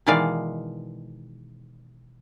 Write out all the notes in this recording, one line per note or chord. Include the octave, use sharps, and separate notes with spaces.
B2 D#3 E3 G#3 D5 F5